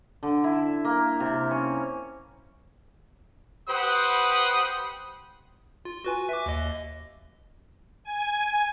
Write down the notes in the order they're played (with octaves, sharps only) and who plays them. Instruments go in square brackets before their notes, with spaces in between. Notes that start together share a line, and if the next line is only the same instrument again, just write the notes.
[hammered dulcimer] D3
E4
A#3
C3
C#4
[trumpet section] G4 B4 C5 F#5 B5 D#6
[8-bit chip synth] F4
F#4 B4 G#5
E5 D6
D#2 D#5
[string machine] G#5